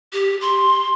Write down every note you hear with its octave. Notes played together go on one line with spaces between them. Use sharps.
G4
C6